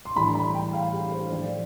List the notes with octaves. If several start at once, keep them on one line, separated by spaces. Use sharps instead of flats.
C6
A2 E3 G3 D4 B5
B5
G5
F5
G4
C5
A2 F3 A3 D5
D5